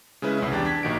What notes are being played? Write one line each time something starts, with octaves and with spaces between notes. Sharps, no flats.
C#3 G#3 C#4 E4 B4
C2 C#4 E4
E2 D4 G4 G5 A6
D4 A5 G#6 B6
A#1 D#3 F#4 D7